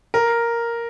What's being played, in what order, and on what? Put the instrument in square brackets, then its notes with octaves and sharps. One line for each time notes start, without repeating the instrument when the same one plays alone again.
[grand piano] A#4